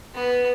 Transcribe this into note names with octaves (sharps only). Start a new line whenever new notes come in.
B3